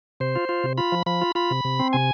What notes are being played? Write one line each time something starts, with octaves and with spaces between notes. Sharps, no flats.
C3 C5
F4
F4
C3
F4 B5
F3
F3 B5
F4
F4 B5
C3
C3
C4
C3 G#5